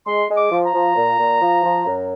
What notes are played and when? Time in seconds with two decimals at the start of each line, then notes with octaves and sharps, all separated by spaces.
0.07 G#3 C6
0.30 G#3
0.37 D6
0.51 F3
0.66 A#5
0.74 F3
0.96 A#2
1.20 A#2
1.42 F3
1.64 F3
1.87 F#2